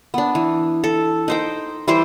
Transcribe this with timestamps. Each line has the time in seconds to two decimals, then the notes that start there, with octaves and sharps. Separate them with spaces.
0.14 B3 D4
0.35 E3
0.84 A4
1.28 D#4 C5 G5
1.88 E3 G3 C5 G5